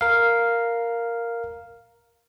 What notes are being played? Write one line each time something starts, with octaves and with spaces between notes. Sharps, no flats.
A#4 F5